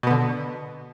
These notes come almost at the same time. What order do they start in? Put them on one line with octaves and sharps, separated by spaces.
B2 B3 D3